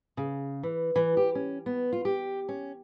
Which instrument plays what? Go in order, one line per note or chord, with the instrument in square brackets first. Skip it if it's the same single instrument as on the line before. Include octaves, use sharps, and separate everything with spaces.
[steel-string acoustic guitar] C#3
E3
E3
G4
C#4
B3
F4
G4
C#4